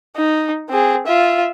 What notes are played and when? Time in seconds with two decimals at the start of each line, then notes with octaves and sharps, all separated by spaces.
0.16 D#4
0.70 C4 G#4
1.07 F4 E5